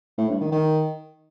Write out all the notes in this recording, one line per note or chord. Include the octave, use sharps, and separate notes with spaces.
A2
G2
D#3
D#3